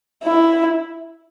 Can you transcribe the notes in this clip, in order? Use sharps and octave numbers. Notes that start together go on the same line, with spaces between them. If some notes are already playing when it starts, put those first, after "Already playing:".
E4